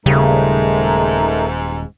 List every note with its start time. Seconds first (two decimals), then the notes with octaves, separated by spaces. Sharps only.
0.06 D#1 G#2 C#3 G3 A3 D#4 A#4